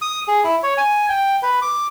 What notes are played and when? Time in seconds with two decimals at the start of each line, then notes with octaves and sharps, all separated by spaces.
0.02 D#6
0.28 G#4
0.44 E4
0.63 C#5
0.78 G#5
1.09 G5
1.43 B4
1.62 D6